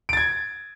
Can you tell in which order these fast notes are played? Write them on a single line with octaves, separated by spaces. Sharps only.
D7 A6 G#6